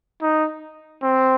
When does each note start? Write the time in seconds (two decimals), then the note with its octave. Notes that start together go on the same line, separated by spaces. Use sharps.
0.22 D#4
1.03 C4